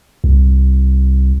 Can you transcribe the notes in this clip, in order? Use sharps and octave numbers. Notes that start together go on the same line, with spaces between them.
C2